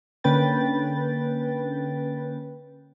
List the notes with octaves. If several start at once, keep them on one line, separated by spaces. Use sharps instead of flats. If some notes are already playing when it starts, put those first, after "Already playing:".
D3 A#3 C#4 B4 G5 A6